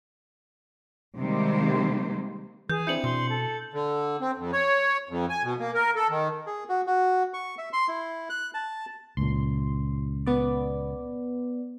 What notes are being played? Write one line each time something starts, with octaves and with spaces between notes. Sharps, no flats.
C3 D#3 G3 G#3 A#3 C5
E3 G#4 G6
C4 D4 E4 G6 C#7 F#7
B2 C6
A4
D3
C4
F2
C#5
F2
G#5
B2
A#3
A#4
A4
D#3
G#4
F#4
F#4
C#6
E5
C6
E4
F#6
A5
C#2 A#2 C6
B3 D5